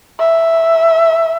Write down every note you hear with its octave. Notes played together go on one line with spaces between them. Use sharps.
E5